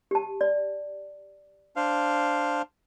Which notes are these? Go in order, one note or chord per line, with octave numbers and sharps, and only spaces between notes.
G4 A5
D5
D4 C5 F5